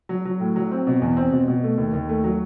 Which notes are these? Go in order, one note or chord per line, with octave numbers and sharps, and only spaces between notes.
F#3
F#3
A2
F#3
C4
B2
E2
C4
B2
B2
A3
D#2
D#2
A3
F#3